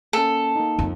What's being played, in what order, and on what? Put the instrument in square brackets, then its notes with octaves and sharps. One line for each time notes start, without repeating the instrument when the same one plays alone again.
[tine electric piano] A#3 C#4 [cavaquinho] A4
[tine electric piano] A#3 D#4
[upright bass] F2